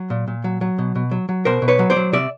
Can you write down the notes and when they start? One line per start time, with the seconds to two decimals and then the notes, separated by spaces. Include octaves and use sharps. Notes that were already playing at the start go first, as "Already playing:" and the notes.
Already playing: F#3
0.10 A#2
0.28 A#2
0.44 F#3
0.61 F#3
0.78 B2
0.95 B2
1.11 F#3
1.29 F#3
1.45 B2 A#4 C5
1.62 B2
1.68 B4 C#5
1.79 F#3
1.90 C5 D5
1.96 F#3
2.13 C3 D5 E5